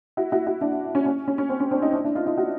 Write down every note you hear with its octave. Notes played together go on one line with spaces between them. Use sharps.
E4 F#4
E4 F#4
E4 F#4
D4 E4
C#4
C#4
C#4
C#4
C4
C#4
C4 D4
C#4 D#4
D4 E4
D4 E4
D#4 F4
D#4 F4
E4 F#4